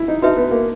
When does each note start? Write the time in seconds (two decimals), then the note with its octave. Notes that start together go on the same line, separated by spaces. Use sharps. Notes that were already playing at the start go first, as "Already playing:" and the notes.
Already playing: E4
0.08 D#4
0.22 D#4 F#4 B4 E5 A5
0.36 B3
0.51 A#3